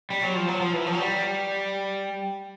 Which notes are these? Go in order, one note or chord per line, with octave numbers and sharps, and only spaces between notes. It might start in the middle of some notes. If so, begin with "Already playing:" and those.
G3
F#3
F3
F#3
F3
E3
F3
F#3
G3